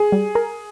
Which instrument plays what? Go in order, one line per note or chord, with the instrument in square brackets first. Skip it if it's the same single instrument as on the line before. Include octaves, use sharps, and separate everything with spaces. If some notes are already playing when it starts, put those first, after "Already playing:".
Already playing: [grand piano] G#4
[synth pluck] G3
A#4